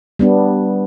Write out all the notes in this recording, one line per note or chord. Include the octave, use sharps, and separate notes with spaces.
G3 B3 D4